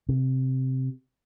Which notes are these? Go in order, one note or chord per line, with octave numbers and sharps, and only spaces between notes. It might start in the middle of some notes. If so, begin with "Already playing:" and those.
C3